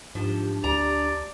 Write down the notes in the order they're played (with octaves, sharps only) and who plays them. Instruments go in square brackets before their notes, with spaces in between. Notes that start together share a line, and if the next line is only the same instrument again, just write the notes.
[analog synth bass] G#2 [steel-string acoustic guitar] F3 [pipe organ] D4 G4
[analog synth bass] D2 [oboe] D5 [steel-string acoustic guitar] A#5